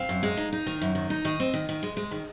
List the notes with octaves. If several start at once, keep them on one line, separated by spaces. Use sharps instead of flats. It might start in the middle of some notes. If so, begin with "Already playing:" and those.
Already playing: C4 F5
F#2
G#3
D#4
D#4
D#3
F#2
D#3
D#4
D#3 D#5
C4
D#3
D#3
G#3
G#3
D#3